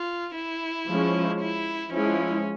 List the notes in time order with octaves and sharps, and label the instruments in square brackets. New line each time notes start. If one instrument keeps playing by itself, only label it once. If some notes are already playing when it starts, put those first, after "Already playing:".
Already playing: [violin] F4
E4
[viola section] F3 G#3 C#4
[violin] E4
[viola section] F3 G#3 E4 [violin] C#4